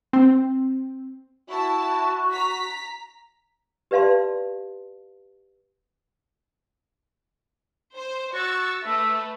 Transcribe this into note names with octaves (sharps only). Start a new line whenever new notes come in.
C4
E4 F#4 A5
A#5 B6
G4 B4 D5 F5 A5 C6
C5
F#4 C#6 E6 A6
A3 B4 E5